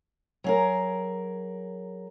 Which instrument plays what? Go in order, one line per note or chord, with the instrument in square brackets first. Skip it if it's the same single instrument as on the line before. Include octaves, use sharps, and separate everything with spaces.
[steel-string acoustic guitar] F#3 G#4 A#4